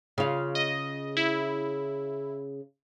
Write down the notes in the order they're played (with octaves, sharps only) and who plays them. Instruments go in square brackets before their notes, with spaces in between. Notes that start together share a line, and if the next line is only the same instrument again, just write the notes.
[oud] C#3 F4
[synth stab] D#5
E4